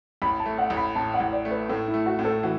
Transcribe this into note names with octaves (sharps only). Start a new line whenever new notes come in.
A1 B5
A5
A3
F#5
A1
B5
A2 A5
F#5
A1
D5
A3
B4
A2 A4
E4
A3
F#4
A2
A4
E3 F#4